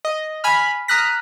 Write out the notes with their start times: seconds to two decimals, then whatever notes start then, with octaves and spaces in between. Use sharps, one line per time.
0.05 D#5
0.44 G#5 B5 F6
0.88 A#5 D#6 F6 F#6 A#6 B6